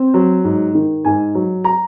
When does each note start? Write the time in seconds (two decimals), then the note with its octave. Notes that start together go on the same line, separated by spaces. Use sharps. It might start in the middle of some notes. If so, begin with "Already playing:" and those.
Already playing: C4
0.14 F#3
0.44 G#2
0.75 D#3
1.05 G#2 G#5
1.35 F#3
1.64 A#5